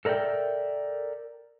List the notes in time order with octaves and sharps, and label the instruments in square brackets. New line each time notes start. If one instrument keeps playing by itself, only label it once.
[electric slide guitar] A4 A#4 D5 E5 G5